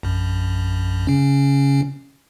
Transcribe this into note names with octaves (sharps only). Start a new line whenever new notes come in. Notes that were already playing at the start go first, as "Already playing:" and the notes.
A#1 F#2
C#3 C#4